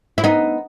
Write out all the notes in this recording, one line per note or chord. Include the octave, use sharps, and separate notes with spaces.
E4
B3 D#4